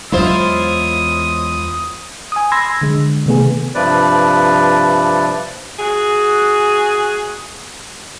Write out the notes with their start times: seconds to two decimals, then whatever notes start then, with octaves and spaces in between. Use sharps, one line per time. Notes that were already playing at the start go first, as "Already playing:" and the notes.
0.12 E2 F#3 G#3 E4 F4 C5 D#6
2.32 G#5 D#6
2.52 B5 C6 E6 G#6 A#6
2.81 D3 G#3
3.26 C3 D#3 A3 B3 G#4
3.75 G2 C3 F3 B4 D5
5.78 F#4 G#4